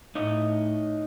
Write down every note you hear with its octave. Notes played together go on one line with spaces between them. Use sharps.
A2 D#4 C#5 D#5